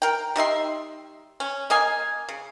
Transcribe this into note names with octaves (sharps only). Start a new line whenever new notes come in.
A#4 G5
G3 D#4 E5 C6
C#4
A#3 D#5 F5 G#5
C#3